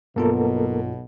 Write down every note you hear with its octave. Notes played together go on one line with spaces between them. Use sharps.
B1 G2 B2 A#3 B3 F4 A4 A#4